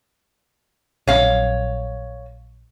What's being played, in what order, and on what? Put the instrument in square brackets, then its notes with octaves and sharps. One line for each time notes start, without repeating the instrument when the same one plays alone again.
[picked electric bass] A#1 F#3 C4 [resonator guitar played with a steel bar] C#5 F5